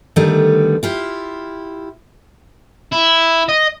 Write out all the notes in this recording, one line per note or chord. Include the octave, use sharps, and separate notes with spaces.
D3 D#3 G3 A3 B3
E4 F4 G4
E4
D#5